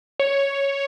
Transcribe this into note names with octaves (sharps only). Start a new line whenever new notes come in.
C#5